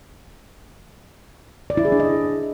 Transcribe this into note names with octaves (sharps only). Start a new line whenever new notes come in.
D5
E4
G#4
D4
D#5